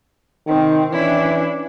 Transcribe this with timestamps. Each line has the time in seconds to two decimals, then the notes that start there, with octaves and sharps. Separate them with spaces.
0.47 C3 D#3 C4
0.92 E3 C#4 D4 E4